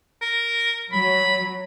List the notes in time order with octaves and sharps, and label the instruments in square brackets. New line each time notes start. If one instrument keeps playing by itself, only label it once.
[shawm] A#4
[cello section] F#3 [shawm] B5